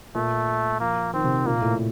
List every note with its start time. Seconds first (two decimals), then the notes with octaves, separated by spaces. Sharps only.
0.15 A#2 A3
0.80 F3 A#3
1.13 D#3 C4
1.24 C3
1.46 A#2 A#3
1.62 A2